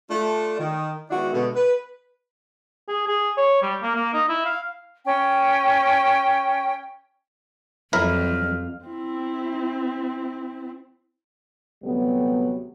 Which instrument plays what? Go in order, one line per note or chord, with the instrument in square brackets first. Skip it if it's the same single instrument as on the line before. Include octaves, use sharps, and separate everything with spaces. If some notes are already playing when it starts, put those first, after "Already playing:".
[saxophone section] A3 D4 F4
D#3
D#3 G#3 B3 D4 E4 F#4
B2 D3 G#3 A3 B3
B4
[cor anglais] G#4
G#4
C#5
G3
A#3
A#3
D#4
E4
F5
[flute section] C#4 G5
[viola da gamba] F2 [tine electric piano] E3 F#3 G3 [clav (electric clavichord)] E4 A#4 E5 [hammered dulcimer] F5
[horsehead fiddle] C4 E4
[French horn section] D2 C3 F#3 G3 A3 B3